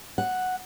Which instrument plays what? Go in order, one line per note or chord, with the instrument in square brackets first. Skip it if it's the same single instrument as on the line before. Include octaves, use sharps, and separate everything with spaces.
[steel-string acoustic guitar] F#5